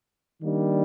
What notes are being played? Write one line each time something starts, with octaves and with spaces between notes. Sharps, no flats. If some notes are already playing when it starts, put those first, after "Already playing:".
D#3 G3 A#3 D4